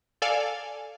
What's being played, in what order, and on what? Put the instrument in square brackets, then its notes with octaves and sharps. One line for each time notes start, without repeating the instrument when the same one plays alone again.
[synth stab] A4 D5 F5 G#5